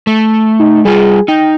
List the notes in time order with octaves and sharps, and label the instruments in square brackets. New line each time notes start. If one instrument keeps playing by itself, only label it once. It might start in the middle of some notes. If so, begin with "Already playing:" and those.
[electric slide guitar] A3
[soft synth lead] D#4
[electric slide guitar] G3 F4 [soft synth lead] G#4
[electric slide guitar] D#4 [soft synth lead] G5